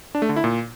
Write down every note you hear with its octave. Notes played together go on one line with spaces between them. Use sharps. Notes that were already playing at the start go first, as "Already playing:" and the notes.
D4
A3
D3
E4
A#2